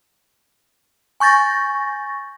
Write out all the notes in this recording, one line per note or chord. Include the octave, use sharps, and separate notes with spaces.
G#5 C#6 G6 A6 A#6